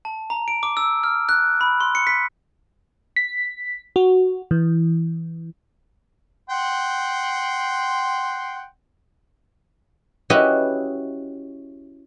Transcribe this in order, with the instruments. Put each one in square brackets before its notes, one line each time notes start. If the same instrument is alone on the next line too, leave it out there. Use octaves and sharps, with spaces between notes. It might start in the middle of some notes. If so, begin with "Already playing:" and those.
[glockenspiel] A5
A#5
D7
D6
E6
F6
F#6
B5
C6
C#7
B6
[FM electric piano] B6
F#4
E3
[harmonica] F#5 G5 C6
[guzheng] C#4 E4 F#4 G4 B4 D#5